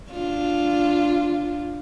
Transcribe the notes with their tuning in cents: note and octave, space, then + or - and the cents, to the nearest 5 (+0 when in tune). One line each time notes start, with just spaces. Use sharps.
D4 +0 F4 +0